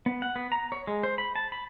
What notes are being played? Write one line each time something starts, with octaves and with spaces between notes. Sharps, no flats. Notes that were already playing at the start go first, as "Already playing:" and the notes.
B3
F#5
B3
A#5
C#5
G#3
C5
B5
A5
B5